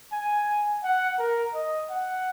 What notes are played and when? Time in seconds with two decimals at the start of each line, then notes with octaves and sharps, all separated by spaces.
0.12 G#5
0.83 F#5
1.19 A#4
1.54 D#5
1.90 F#5